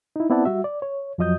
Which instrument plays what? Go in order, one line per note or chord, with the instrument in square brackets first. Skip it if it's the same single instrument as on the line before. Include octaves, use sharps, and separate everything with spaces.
[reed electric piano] D#4 E4
B3 C4 E4 D5 F#5 A5
G3 F#4 E5
D5
C#5
F2 F3 F#3 D#5 D#6 G6